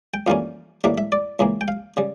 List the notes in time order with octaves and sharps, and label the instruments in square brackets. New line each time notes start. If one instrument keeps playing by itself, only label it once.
[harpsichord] G5
F2 E3 G3 A#3 C#4 F5
A1 A2 G3 A#3 E5
E5
D5
C#2 C#3 E3 A#3
G5
F5
C#3 G3